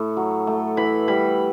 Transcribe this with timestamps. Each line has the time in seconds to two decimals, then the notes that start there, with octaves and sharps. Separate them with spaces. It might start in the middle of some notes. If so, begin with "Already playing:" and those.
Already playing: A2 A3
0.17 F#3
0.47 A3
0.77 E3 B5
1.08 G3 B5